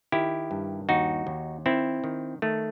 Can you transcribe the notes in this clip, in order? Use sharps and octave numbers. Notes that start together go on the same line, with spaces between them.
D#3 E4 G4
G2
D#2 D#4 F#4
D#2
D#3 C4 E4
D#3
D#3 A3